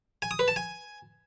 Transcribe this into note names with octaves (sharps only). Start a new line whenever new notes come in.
G#5
D#6
B4
A5
G#5